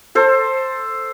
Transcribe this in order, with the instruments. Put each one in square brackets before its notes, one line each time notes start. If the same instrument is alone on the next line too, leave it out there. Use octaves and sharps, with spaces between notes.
[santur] A4 C5